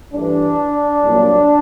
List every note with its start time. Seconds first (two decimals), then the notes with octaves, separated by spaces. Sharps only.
0.14 G2 E3 A3 D4
1.03 C2 A#2 F#3 A#3